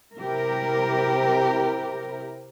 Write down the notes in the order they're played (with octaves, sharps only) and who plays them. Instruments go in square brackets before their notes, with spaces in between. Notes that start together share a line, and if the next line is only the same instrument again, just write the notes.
[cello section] C3 E4 G4 A#4